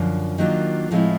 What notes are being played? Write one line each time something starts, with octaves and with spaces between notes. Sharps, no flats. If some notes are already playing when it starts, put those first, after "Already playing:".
Already playing: F#2 D3 F3
D#3 F#3 A#3 D4 F4
A2 F3 G#3 C4 E4